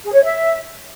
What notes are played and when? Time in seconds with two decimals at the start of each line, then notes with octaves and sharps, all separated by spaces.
0.04 G#4
0.13 C#5
0.23 E5